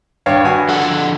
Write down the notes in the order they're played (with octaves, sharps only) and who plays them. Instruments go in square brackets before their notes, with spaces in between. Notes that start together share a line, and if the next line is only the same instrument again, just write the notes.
[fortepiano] G2 C#5 F5
G2 F#4 G#5
[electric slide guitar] D3 F3 F#5 [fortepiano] A4